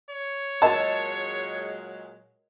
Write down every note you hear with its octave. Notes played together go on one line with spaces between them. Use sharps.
C#5
A#2 F#3 G#3 A#4 D#5 A5 E6